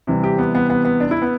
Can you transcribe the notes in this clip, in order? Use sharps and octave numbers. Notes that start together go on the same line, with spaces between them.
C3 E3 G3
G4
B3
B3
B3
B3
D4
E4
B3